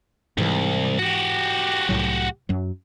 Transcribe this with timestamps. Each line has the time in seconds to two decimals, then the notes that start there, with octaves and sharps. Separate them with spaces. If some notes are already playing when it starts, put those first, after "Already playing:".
0.38 C2 G#2 E3
0.99 F#4 G4
1.89 C2 A2 F#3
2.49 F#2 F#3